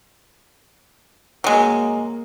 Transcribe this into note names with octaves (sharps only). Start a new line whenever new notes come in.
F#3 G#3 A#3